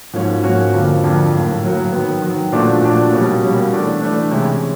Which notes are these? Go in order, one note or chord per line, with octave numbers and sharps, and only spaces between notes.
G#2 F3 A#3 C#4 F#4
G#2 F3 A#3 C#4 F#4
F2 D3 F3 A#3
F2 D3 F3 A#3
A2 F#3 A#3
A2 F#3 A#3
D#3 F#3 B3
D#3 F#3 B3
A#2 F3 A3 D4 F#4
A#2 F3 A3 D4 F#4
B2 G3 A#3 C#4
B2 G3 A#3 C#4
E3 A3 D4
E3 A3 D4
C3 E3 G#3 C#4 E4